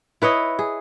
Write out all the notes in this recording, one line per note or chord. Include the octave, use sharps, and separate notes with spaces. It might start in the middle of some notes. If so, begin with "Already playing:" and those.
E4 B4 C#5 D#5
G#4